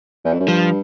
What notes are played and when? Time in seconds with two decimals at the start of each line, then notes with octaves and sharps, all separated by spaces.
0.25 E2
0.33 F2
0.40 F#2
0.48 G2 F3